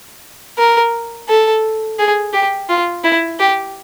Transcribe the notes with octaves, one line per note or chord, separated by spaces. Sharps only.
A#4
A4
G#4
G4
F4
E4
G4